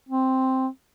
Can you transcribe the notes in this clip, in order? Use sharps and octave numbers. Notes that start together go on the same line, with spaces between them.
C4